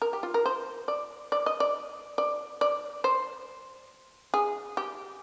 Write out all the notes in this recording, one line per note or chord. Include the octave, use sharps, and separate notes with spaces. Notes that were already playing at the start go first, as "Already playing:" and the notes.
A#4
G4
F4
A#4
C5
D5
D5
D#5
D5
D5
D5
C5
G#4
G4